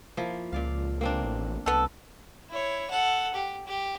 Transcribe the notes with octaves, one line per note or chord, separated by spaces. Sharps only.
F3 A#3 E4
C#2 A#2 D5 F5
A#3 C4 D4
A1
C2 B3 A4
E4 C#5
A4 F#5
G4
G4